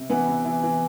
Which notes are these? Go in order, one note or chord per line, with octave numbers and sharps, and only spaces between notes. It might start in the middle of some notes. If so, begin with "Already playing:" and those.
Already playing: C3
E3 B3
C3
E3
E3